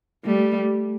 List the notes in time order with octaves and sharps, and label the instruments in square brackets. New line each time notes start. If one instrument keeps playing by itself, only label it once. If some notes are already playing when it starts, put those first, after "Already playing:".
[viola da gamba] G3 A3